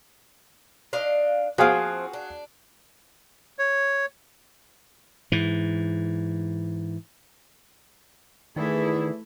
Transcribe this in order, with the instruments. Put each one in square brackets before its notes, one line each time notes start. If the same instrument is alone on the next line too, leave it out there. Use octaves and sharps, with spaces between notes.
[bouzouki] D4 D#5 F5
[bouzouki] F3 C4 [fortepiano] F#4 G#4 F5
[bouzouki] D4
[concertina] C#5
[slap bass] G#2 E3
[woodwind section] E2 E3 G#4 [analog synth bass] D#3 [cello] A3 E4